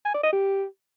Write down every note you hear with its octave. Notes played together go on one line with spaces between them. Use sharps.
G#5
D5
D#5
G4